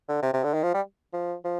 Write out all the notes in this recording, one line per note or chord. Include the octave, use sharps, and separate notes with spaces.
D3
C3
C3
D3
D#3
F3
G3
F3
F3